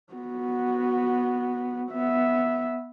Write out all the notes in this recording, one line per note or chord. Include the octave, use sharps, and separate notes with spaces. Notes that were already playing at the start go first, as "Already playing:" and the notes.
B3 F#4
B3 E5